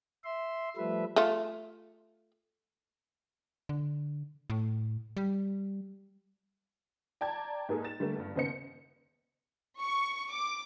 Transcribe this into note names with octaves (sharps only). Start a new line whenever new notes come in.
E5 C6
F3 G3 A3 B4 E5
A3 F4
D3
A2
G3
D5 G5 A5 A#5 G#6
G#2 A#3 G#4 A4
A6 E7
D3 G3 A3 A#3
G1 G2
D#2 C#3 B3 C5 D#5 C#7
C#6
D6